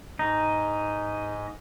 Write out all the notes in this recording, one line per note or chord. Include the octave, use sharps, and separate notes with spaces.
G#2 D#4 D#5